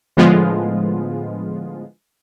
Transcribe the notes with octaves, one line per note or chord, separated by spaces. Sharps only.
A2 D3 F3 G#3 B3 F4